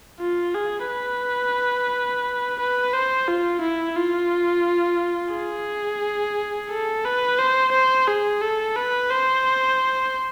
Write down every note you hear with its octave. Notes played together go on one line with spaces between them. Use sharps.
F4
G#4
B4
B4
C5
F4
E4
F4
G#4
A4
B4
C5
C5
G#4
A4
B4
C5